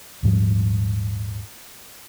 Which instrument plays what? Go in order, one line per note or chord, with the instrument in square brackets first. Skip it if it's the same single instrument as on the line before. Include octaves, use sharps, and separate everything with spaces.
[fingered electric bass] D#1 G#2 F3 G3